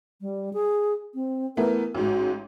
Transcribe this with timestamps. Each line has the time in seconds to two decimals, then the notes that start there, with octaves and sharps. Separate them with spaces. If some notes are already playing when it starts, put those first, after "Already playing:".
0.21 G3
0.53 G#4
1.15 C4
1.57 E3 A3 B3 A#4
1.95 A1 G#2 F#4